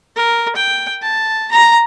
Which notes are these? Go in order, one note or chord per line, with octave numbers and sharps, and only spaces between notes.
A#4
G5
A5
A#5